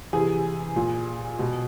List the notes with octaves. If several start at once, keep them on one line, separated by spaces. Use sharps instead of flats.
C3 E3 G#4 G#5
A#2
B2